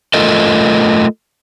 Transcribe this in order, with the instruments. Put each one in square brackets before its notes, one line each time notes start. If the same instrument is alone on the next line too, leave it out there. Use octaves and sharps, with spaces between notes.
[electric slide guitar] A3 F4 A4 A#4 D#5